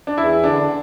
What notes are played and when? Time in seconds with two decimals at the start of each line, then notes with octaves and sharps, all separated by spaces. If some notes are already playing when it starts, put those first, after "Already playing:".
0.07 D4
0.17 E2 E4
0.44 D3 D4